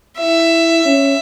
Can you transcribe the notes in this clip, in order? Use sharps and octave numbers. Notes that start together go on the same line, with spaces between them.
E4 E5
C#4